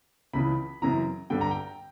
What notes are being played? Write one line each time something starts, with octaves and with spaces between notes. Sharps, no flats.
C#2 C#3 E3 B5
F#2 C#3 E3 A#5
G2 D3 G5
A#5
G5